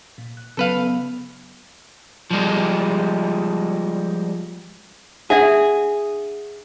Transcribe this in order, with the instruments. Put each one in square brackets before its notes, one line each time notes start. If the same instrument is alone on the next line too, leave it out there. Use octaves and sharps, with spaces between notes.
[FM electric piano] A#2
F#6
[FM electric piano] C#3 F#3 B3 [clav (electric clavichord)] A4 B4 F5
[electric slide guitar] F3 G3 G#3
[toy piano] D4 E5 F#5 [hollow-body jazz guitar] G#4